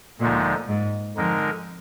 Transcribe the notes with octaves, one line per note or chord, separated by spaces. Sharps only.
D2 A#2 D3 F3 G#3 D#4
G#2
F2 D3 G#3 D#4 A#4